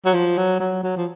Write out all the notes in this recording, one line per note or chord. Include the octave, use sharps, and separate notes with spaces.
F#3
F3
F#3
F#3
F#3
F3